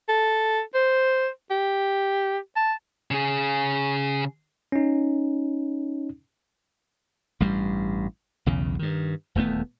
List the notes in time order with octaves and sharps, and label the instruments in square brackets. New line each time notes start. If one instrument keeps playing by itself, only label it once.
[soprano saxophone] A4
C5
G4
A5
[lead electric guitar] C#3 G#4
[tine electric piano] C#4 D#4
[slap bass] A1 G2 G3
B1 E2 C#3
G2 D#3
D#1 E2 A3 B3